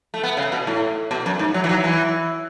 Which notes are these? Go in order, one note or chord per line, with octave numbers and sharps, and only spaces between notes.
A3
B3
C#3
B2
A2
B2
F#2
G#2
F#3
E3
F#3
E3